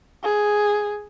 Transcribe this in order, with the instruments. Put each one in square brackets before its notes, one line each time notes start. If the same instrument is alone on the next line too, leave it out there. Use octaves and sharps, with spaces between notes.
[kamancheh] G#4